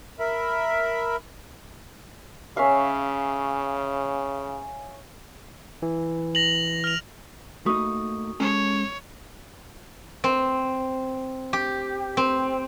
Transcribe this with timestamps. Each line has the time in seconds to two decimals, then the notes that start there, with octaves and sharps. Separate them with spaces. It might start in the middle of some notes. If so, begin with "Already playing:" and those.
0.19 A#4 E5 B5
2.57 C#3 C#4 E5 F5
5.82 E3
6.35 A#6 F7 F#7
6.84 F6 F7
7.66 A3 A#3 D#4 F#4 C#6 D#6
8.40 G#3 C#4 A4 C#5
10.24 C4
11.53 G4
12.17 C4